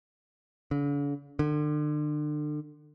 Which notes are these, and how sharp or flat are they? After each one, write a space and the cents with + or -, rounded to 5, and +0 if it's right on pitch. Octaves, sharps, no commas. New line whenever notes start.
D3 -45
D3 +35